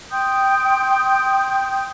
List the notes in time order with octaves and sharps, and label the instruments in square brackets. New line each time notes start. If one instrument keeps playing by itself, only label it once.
[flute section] G5 C6 D#6 G6